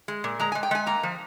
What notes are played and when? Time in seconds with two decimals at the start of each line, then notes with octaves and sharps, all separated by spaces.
0.08 G#3
0.24 A#2
0.40 G#3 A#5
0.52 G#3 G#5
0.63 G5
0.71 G#3 G#5
0.86 A#3 A#5
1.03 F3